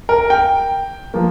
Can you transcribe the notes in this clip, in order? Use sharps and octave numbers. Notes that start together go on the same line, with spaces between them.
A#4
G5
F3 A#3